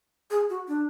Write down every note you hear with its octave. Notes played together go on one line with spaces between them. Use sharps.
G#4
F#4
D4